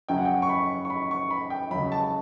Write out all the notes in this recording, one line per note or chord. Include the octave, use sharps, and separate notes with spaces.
F#2 C#3 F#3 C#4 G5
F#5
G5
C#6
B5
C#6
B5
C#6
B5
G5
C#2 C#3 F#3 B5
A5